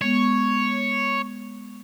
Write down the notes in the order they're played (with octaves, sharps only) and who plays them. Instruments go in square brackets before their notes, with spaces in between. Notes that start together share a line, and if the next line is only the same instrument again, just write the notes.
[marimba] G#3 B3 [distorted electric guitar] C#5